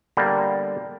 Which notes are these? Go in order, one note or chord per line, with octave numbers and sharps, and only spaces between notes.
D3 G3 A#3 B3